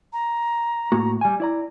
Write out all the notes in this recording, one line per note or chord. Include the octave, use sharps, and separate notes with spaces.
A#5
A2 A#3 F#4
G3 G#5
E4 D5 A#5